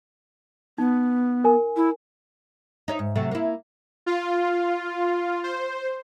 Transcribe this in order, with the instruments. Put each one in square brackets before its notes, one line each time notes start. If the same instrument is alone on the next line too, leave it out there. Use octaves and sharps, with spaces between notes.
[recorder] B3 [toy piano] D#4
[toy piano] A#4 G#5
[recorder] E4
[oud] D#4 C#5 E5
G#2
C3 F#3 A3
A#3 E4
[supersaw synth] F4
C5